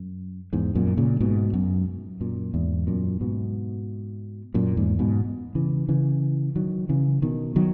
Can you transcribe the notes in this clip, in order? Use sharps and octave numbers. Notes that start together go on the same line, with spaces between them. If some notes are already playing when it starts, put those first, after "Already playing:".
Already playing: F#2
E2 G#2
F#2 A#2
A#2 C#3
G#2 B2
F#2
F#2 A#2
E2 G#2
F#2 A#2
G#2 B2
F#2 A#2
E2 G#2
G#2 B2
C#3 E3
C#3 E3
D#3 F#3
C#3 E3
B2 D#3
D#3 F#3